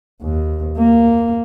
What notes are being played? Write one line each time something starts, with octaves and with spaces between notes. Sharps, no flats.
D#2
A#3